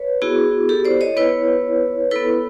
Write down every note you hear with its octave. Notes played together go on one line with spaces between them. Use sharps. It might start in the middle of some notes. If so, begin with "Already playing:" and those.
Already playing: B4 C#5
B3 E4 F#4 G#4
G4 A4
C5 D5
C#5 D#5
B3 E4 B4 C#5
B3 E4 A4 B4